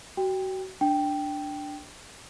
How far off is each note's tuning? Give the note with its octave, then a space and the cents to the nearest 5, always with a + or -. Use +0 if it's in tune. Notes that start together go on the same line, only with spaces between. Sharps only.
F#4 +30 G5 +15
D4 +0 G5 +0